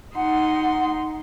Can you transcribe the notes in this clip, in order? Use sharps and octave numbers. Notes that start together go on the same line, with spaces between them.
D#4 F#5 C6